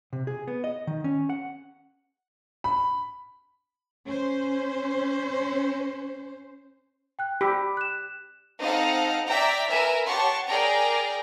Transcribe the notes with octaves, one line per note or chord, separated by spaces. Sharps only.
C3
G#4
B3
D#5
D#3
C#4
F#5
B5
C#4 C5
G5 F#6
G4 B5 E6 B6
F#6 E7
C4 D#4 A4 F5 F#5
D5 E5 G5 A#5 B6
A#4 B4 E5 G#5
G4 C#5 F#5 A5 C6 C#6
G#4 A#4 D5 G5 A#5